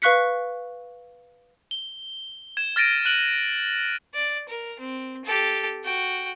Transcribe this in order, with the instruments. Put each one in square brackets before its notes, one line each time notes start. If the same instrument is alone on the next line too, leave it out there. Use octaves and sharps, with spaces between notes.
[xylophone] B4 F5 C#6 F#6 B6 C#7
[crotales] G7
G#6 E7
F6 A6 A#6 D7 D#7
F#6 D7 D#7 F#7
[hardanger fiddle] D5
A#4
C4
G4 A4
F#4 G5